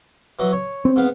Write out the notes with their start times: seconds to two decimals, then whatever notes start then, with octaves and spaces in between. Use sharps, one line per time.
0.39 E3 F#3 D#5
0.52 C#5
0.85 C4
0.96 G#2 B3 F5